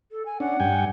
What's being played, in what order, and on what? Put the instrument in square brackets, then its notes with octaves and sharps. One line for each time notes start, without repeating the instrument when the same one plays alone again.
[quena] A4
G#5
[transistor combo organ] C#4 D4 [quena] F#5
[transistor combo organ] G2 G5 G#5